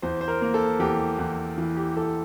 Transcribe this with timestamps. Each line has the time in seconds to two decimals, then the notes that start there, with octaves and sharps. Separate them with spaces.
0.02 E2 C5
0.21 C5
0.28 A#4
0.41 A#3
0.54 A4
0.79 E2 G4
1.18 E2
1.58 E3
1.77 G4
1.96 E2 A4